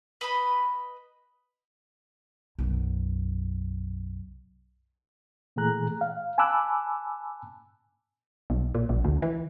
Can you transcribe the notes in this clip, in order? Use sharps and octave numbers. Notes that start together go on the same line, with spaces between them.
B4 D#5 B5
B1 F#2
A#2 E3 A3 G#4 A#5 F#6
F5
G#5 A5 B5 D6 E6 F#6
B1
A#2
A#1
D2
E3